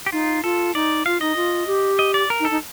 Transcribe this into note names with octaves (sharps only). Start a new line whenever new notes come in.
G4
D#4 F4
F4 A4
D#4 D5
F4 F5
D#4 D#5
F4
G4
D#5
D5
A#4
D#4
A4
D#4